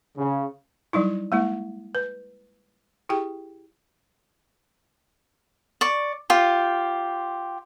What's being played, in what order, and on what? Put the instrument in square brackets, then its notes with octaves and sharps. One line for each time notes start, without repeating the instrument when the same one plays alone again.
[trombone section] C#3
[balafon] F#3 G3 D#4 E4
G#3 A#3 E4
B4
E4 G4 G#4 G5
[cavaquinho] D5 C#6
F4 G4 C5